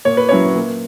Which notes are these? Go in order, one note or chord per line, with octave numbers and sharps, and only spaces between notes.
A#2 C#5
B4
F#3 C#4 E4 C#5
A#2